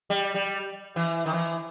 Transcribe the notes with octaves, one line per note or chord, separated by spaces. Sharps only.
G3
G3
E3
D#3
E3